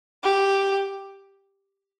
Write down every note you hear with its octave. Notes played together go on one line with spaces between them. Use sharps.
G4